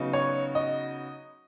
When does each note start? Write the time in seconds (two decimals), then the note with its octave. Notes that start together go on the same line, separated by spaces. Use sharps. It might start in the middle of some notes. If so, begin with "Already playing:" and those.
Already playing: C#3 F#3 B3 D#4
0.13 C#5
0.55 D#5